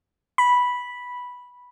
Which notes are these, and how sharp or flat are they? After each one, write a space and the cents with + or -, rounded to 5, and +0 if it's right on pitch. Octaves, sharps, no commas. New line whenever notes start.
B5 -5